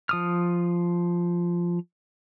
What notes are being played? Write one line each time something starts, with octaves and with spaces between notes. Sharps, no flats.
F3 D#6 F6